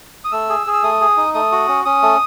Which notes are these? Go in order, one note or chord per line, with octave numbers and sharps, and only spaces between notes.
D#6
A3 E6
G#4
G#4
E6
A3 D#6
G#4
D#4
A3 D#6
F#4
C#4
C#4 D#6
A3